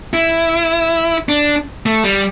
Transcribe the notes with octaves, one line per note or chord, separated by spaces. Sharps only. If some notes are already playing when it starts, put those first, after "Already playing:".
E4
D4
A3
G3